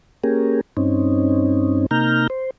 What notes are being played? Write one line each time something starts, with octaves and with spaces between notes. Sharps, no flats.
A#3 C#4 G4 G#4 A#4
G2 C4 C#4 D#4
C3 A#3 D#4 A#5 F6 G6
C5